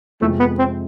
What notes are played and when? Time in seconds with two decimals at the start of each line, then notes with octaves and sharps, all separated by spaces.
0.21 F2 C3 F3 G#3 A3
0.39 B3
0.58 C4